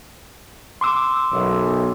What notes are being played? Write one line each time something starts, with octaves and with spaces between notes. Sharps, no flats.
C6 D6 E6
B1 F#2